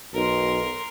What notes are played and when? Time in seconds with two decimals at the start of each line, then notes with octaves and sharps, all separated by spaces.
0.14 B1 A#4 C6